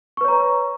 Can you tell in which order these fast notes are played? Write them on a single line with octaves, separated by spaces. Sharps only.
C#6 B4 C#5 A#5